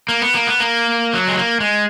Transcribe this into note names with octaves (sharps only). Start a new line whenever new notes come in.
A#3
B3
A#3
B3
A#3
F#3
G#3
A#3
G#3